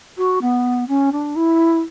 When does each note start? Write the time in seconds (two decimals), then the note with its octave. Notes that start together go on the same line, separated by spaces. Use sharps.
0.17 F#4
0.41 B3
0.88 C#4
1.12 D4
1.36 E4